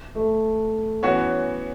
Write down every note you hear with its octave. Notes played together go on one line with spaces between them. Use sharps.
A3
E3 B3 C#4 F#4 C#5